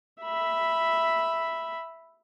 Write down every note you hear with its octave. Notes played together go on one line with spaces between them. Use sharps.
E5 B5